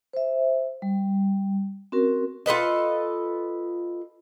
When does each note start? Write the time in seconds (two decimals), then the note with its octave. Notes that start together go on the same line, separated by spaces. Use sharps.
0.13 C5 E5
0.82 G3
1.92 C4 C#4 F#4 A#4
2.46 F4 A4 B4 D#5